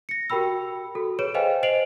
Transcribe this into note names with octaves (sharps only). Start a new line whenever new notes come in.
A#6 C#7
F#4 G4 A#4 G5 B5 E6
F#4 A4
G#4 B4 C#5 D7 E7
B4 C5 D#5 F5 G5 G#5
C5 D#5 C7 D7 F7 F#7